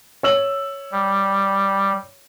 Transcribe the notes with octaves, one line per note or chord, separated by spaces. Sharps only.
C#5 E6 F#7
G3